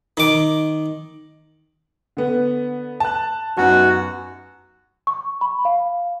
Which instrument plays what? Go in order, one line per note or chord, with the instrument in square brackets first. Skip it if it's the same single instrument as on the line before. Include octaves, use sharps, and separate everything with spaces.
[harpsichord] D#3 D6
[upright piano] D3 B3
A5 F#6
[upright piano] F#2 B3 D#4 [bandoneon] F#4
[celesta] C#6
B5
F5